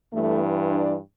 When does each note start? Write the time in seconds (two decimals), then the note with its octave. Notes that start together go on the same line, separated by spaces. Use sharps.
0.13 G2 E3 A3
0.71 D4